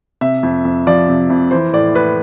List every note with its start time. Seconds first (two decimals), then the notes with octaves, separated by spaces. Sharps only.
0.21 C3 E5
0.43 F2
0.65 F2
0.87 F3 D5
1.08 C3
1.30 F2
1.51 E3 C5
1.73 A2 D5
1.95 A2 B4